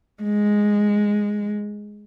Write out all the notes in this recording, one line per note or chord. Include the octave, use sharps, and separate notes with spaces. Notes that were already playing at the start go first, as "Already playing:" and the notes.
G#3